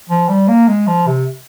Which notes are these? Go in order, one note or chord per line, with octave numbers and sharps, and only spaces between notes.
F3
G3
A#3
G#3
F3
C3